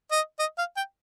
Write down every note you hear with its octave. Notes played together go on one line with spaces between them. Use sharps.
D#5
D#5
F5
G5